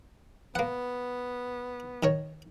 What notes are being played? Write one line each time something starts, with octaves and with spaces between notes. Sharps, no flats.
A#3 B3 F#5
D#3 A#4 C#5